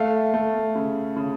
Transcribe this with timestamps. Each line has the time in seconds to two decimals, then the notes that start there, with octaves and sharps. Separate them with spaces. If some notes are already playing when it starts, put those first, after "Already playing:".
Already playing: A3 F5
0.34 A3
0.75 C#3
1.16 C#3